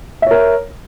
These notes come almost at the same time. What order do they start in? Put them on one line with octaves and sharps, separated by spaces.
E5 C#5 A#4